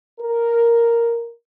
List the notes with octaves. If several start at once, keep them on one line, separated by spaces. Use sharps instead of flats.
A#4